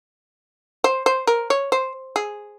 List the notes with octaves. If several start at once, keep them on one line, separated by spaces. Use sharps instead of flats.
C5
C5
A#4
C#5
C5
G#4